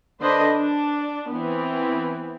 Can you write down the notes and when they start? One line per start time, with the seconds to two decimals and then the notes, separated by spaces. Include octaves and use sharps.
0.21 D3 D4 B4 C5 D5 D#5
0.54 D4
1.29 E3 B3 C4